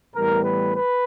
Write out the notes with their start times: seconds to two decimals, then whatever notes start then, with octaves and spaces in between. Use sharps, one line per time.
0.13 A2 E3 G3 B3 A#4
0.44 B4
0.75 B4